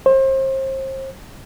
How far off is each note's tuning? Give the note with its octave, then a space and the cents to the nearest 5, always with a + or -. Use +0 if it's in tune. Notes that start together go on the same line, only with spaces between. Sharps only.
C5 +35